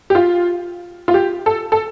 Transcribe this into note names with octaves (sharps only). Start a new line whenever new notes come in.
G4
F4
F4
G4
A4
A4